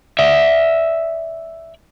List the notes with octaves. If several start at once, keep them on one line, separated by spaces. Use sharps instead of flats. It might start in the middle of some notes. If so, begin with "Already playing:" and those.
D5 E5